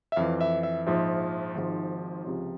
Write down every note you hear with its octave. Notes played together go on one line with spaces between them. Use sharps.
E5
F2 E3 F5
E5
E5
A#1 G#2 F3 E5
G#1 G#2 F3
C#2 C3 F3 C#5